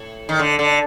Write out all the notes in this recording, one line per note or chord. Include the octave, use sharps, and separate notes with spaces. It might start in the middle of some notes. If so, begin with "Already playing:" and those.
Already playing: A2
D#3
D3
D3